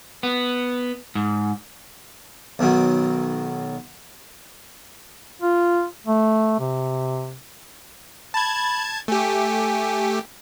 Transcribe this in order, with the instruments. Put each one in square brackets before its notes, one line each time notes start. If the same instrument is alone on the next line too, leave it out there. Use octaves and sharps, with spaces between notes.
[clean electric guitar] B3
G#2
[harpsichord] B1 B2 D#3 F#3
[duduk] F4
A3
C3
[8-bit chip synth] A5 G#6 [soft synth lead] B5
[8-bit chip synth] A3 G4 [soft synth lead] G#5